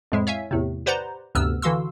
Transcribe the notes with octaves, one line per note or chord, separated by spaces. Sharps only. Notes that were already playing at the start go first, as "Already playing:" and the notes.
F2 A2 G#3 E4
C#5 E5 F5 G#5
E2 A2 C3
G4 B4 C5 D5 F#5 A#5
D2 G2 C3 B3 E6 F6
D3 E3 F#4 F5 C6 E6